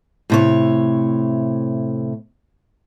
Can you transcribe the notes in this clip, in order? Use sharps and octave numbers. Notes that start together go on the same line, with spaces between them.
A2 C3 C#5